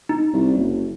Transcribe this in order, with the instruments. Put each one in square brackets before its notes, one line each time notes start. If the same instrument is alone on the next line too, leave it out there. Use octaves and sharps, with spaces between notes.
[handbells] D#4
[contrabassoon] C2
F#1